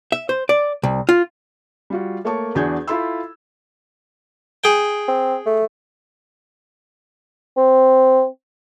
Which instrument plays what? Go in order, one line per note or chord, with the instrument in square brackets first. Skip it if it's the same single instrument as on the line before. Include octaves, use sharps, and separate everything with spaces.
[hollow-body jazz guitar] E5
C5
D5
C2
F4
[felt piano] G3 F4 F#4
A3 A#3 C#5 A5 C#6
E2 D4 F#4 G#4 G6 G#6
E4 F4 A4 B5 C6 E6
[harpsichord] G#4 G5
[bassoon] C4
A3
C4